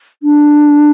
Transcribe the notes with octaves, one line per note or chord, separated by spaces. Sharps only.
D4